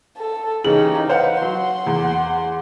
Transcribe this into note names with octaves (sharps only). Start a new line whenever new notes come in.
A4
C#3 E3 D#4 G4 F#7
B4 C5 F5 F#5
F#3 F#5 C6
E2